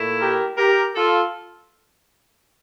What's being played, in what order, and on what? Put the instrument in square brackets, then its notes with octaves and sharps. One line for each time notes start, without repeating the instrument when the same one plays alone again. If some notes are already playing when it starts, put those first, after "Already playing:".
Already playing: [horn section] A#2 A3 E4
G4 A#4
G4 A#4
F4 A4